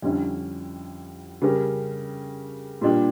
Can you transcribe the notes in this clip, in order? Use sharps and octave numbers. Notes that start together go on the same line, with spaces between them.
F2 D3 G3 C#4 E4
C#3 G3 C#4 G4 A#4
A#2 G3 A#3 D4 G4